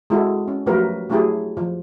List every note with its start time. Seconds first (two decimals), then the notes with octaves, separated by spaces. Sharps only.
0.10 G#3 C4 E4 F#4 A4
0.48 C#4
0.66 F3 F#3 A3 G4 A#4 B4
1.10 F#3 A3 D4 E4 G4 G#4
1.57 F3